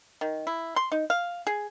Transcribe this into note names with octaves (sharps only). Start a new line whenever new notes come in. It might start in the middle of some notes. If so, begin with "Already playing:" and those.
D#3
E4
C6
D#4
F5
G#4